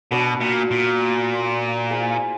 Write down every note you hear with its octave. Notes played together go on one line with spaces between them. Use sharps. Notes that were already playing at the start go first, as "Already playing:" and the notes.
B2 B3 D4 F#4 B4
A#2
A#2
E4 G#4 C5